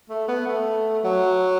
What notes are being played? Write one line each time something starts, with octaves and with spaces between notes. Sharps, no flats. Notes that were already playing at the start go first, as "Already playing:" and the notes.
A3
B3
A3
F#3